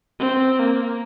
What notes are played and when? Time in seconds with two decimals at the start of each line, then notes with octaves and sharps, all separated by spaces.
0.20 C4
0.60 A#3